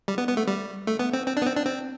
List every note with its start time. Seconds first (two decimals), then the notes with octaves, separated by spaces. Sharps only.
0.08 G3
0.18 B3
0.28 B3
0.37 A3
0.47 G3
0.87 A3
0.99 B3
1.13 C4
1.27 C4
1.37 D4
1.42 B3
1.46 C4
1.57 D4
1.66 C4